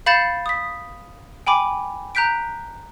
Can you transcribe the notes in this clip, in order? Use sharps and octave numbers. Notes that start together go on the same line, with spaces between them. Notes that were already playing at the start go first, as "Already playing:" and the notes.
F5 B5 G6 A6 C#7 E7
D#6 B6
G5 G#5 B5 D6
A#5 F#6 G6 B6 D7